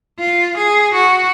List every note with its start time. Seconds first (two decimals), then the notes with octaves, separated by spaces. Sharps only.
0.19 F4
0.57 G#4
0.94 F#4